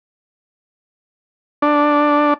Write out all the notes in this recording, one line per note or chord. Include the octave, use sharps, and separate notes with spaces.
D4